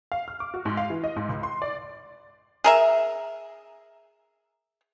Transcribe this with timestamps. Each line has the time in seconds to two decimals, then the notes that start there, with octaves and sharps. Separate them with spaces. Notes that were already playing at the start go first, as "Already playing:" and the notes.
0.12 F5
0.28 F6
0.40 D6
0.54 F#4
0.65 G#2
0.77 F5
0.90 E3
1.04 D#5
1.16 G#2
1.29 C#2
1.43 C6
1.62 D5
2.64 G#4 A#4 E5